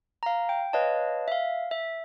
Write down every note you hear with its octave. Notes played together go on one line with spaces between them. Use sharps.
F5 A#5
G5
B4 C#5 D#5 F5 A5
E5 F5
E5